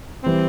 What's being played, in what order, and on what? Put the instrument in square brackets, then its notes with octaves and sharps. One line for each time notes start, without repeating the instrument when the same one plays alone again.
[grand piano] E3 G3 [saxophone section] C4